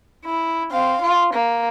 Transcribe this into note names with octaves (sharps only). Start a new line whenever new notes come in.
E4
C4 F5
F4
A#3